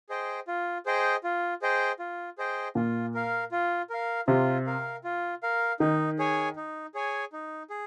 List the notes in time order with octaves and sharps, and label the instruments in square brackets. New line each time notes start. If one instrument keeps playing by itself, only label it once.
[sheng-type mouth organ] G#4 C5 D#5 G5
F4
G#4 C5 D#5 G5
F4
G#4 C5 D#5 G5
F4
G#4 C5 D#5 G5
[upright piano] A#2 [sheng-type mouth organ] F4
[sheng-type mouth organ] A#4 F5
F4
A#4 F5
[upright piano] C3 [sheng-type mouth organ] F4
[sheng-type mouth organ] A#4 F5
F4
A#4 F5
[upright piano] D#3 [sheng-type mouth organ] D#4
[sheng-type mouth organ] G#4 C#5 G#5
D#4
G#4 C#5 G#5
D#4
G#4